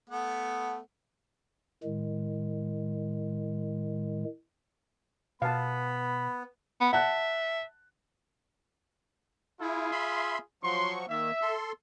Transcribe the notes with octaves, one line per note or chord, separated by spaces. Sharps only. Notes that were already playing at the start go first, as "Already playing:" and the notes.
A3 B3 F#5
A2 D#3 G#3
B2 B3 F5 A5 B5
B3
E5 F#5 A5 F#6
E4 F4 G#4
E5 B5 C6
F3 F#3 C6 C#6
D#3 A#3 E5
A4 C6